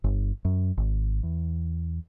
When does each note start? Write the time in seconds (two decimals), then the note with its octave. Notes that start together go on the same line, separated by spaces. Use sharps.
0.04 G1
0.45 F#2
0.77 G#1
1.23 E2